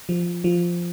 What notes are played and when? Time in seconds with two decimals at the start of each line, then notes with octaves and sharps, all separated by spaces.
0.09 F3
0.44 F3